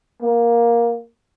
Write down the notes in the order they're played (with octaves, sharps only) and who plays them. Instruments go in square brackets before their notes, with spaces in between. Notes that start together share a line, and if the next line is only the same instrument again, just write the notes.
[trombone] A#3